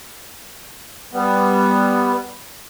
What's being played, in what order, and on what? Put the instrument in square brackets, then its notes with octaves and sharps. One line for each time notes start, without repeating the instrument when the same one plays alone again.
[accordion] G3 B3